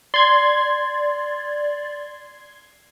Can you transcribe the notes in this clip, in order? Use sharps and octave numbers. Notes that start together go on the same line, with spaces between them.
D5 C6 G#6